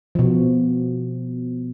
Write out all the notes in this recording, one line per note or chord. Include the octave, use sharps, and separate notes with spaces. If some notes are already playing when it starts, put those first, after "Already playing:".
B2 F3